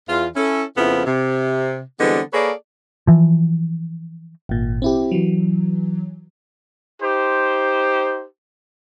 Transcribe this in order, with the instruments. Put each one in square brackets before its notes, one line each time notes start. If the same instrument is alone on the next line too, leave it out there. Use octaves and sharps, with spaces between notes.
[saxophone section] E2 F4
C#4 E4 A4
F2 C#3 F3 B3 E4
C3
D3 E3 G3 G#3 B3 C4
A#3 G#4 A4 B4 C#5 D5
[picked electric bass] E3 F3
[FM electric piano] G#1 A#2
C4 E4 G4
E3 F#3
[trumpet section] D#4 G4 C5